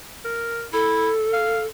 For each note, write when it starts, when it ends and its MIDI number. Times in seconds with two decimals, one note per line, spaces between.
0.25 0.65 70
0.73 1.10 64
0.73 1.66 69
1.33 1.61 77